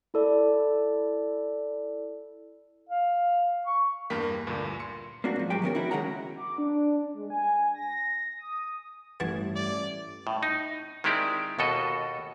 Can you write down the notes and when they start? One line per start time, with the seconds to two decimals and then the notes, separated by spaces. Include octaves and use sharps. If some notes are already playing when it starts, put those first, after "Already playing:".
0.14 E4 A4 D5
2.89 F5
3.66 C#6
4.10 E2 G2 A#3 A#4 G5 B6
4.47 D2 G2 A#2
4.80 C6 C#7
5.24 A#3 C4 D4 F#4
5.36 G#2 F3
5.50 F3 F#3 G#3 G4 G5
5.62 D#3 B3 C#4 A#4
5.75 D#4 E4 F#4
5.91 D2 D#3 G#3 C#4 F#5 A#5
6.36 D6
6.58 D4
7.14 G#3
7.30 G#5
7.74 A#6
8.39 D#6
9.20 A1 G2 E3 G3 F#4 A5 G#6
9.56 D5
10.27 A2
10.43 D#4
11.04 D#3 G#3 C4 E4 G4 D5
11.59 D#2 B2 F#4 A4 D#5